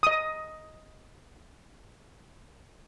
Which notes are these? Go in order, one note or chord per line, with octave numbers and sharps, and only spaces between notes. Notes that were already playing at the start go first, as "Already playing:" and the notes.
D#5 D#6